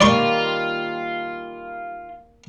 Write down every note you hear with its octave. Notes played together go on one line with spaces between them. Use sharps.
D#3 G3 A#3 F4 D5 C6 C#6